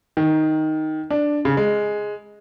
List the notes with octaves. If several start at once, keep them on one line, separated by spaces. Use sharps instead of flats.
D#3
D4
C#3
G#3